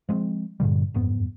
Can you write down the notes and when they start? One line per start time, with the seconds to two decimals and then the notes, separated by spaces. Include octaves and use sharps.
0.09 F3 G#3 B3 C4
0.60 G2 A#2 D3 G3
0.94 F#1 F2 G#2 B3